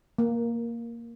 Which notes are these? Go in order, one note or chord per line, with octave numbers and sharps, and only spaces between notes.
A#3